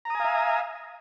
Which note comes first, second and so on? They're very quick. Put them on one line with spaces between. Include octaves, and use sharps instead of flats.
A#5 D#6 G#5 F5 E5